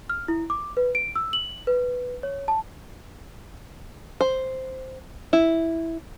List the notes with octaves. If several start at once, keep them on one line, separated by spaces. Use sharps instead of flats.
F6
E4
D6
B4
D7
E6
F#7
B4
C#5
A5
C5
E4